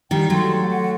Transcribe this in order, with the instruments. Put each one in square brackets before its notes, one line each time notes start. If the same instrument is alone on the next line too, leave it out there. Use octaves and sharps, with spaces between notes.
[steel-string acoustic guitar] D#3 G3 [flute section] G5
[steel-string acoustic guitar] F#3 A3 [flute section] C6
[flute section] F#5
F#5